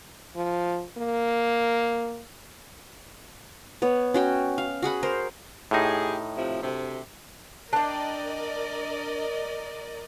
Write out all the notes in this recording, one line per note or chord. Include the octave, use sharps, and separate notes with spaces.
F3
A#3
B3 C#5
C#4 F#4 G5
F5
F#4 G#4 F#5 B5
A#4 C5
A2 D#4 G4 G#4
C3 F3 E4
D2 C3
D4 A#4 D5 D#5 G5